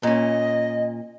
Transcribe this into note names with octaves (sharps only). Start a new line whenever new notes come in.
A#2 C#4 D#5